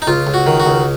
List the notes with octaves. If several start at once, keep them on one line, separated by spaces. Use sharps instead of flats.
D#4
C#2 F4
C#2
F#4
D#3
F#4
C#2